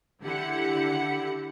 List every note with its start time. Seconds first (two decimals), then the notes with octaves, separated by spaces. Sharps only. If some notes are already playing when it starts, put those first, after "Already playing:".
0.22 D3 E4 G4 F#5 C#7